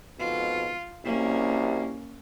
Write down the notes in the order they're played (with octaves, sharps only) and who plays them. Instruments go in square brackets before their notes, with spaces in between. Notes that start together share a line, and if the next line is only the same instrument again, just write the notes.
[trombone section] F2 G#2 B2 [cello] F4
[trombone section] C2 F#2 G3 [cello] A#3 C#4